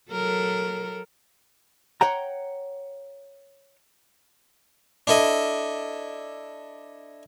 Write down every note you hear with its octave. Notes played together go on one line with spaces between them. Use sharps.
F#3 A4 A#4
C#5 F#5 G5 A#5
D4 E4 A4 D#5